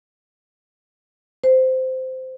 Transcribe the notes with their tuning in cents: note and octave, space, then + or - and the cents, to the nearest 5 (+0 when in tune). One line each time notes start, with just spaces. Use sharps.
C5 -15